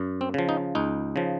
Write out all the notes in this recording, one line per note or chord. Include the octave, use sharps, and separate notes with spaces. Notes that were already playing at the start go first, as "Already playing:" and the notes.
Already playing: F#2
C4
C#3 F3
D#4
C#2 D#4
C#3 F3